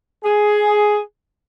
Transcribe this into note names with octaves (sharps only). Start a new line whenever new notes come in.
G#4